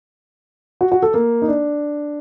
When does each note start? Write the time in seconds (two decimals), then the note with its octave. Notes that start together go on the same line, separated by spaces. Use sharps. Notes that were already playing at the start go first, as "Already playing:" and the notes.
0.81 F#4
0.92 F#4
1.03 A4
1.14 A#3
1.42 D#4
1.48 D4